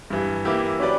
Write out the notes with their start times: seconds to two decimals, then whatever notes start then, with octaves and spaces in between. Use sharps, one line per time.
0.10 G2 E3 G3
0.45 E3 A#3 E4 G4
0.79 F#3 C#4 G4 B4 D5